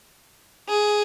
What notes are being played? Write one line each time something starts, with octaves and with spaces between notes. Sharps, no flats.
G#4